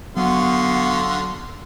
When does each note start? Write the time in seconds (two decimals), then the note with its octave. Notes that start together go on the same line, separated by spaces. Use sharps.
0.17 D3 F#3 B3 F#4 F5 C6